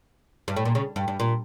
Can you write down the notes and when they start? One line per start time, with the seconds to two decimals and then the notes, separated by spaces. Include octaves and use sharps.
0.48 G2
0.57 A2
0.65 A#2
0.75 C#3
0.96 G2
1.08 G2
1.20 A#2